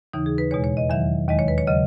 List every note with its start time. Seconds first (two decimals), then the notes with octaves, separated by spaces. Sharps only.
0.13 D#2 C#3 E3 D#4
0.26 G#4
0.38 B4
0.51 E2 B2 G#3 C#5
0.64 C#5
0.77 D#5
0.90 E2 D#3 F#3 E5
1.28 D#2 D#3 G#3 D#5
1.39 C#5
1.48 B4
1.58 C#5
1.67 C#3 F#3 D#5